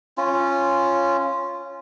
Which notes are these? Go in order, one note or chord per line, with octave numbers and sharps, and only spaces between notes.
C#4 F4